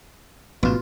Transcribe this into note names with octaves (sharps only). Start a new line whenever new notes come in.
A1 G#2 B2 F4